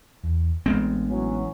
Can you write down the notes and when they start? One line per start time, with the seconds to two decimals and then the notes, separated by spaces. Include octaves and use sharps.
0.24 E2
0.66 A1 G#3 B3 C4 D4
1.09 E3 F#3 C#4